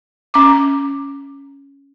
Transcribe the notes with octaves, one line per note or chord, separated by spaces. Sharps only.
C#4 D6